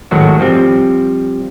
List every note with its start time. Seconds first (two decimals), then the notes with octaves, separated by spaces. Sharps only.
0.11 G#1 A2 D#3 F#3 F#4
0.39 F3 G3 C4